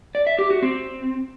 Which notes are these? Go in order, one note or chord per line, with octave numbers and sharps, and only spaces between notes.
D5
E5
G4
F#4
C4